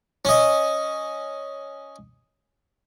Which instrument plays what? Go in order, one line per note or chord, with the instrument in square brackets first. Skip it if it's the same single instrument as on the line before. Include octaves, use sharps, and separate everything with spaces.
[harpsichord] C#4 D#5